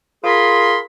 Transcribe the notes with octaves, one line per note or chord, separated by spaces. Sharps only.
F4 G#4 A#4 B5 C6